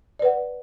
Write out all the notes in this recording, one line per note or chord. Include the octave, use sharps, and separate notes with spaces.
B4 D5 F#5